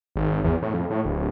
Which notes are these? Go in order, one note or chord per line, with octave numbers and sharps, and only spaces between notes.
G#1
G#1
E2
A2
F2
A2
D1